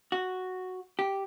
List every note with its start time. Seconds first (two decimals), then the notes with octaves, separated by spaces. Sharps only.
0.12 F#4
0.99 G4